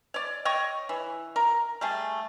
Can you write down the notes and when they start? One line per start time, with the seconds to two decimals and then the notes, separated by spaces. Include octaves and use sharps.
0.14 C#5 D5
0.45 C#5 D#5 G5 C#6
0.89 E3
1.36 A#4
1.81 G3 A3 G#4